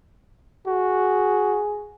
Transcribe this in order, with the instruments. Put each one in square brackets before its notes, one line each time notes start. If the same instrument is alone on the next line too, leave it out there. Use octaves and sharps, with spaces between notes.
[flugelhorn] F#4 [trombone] G#4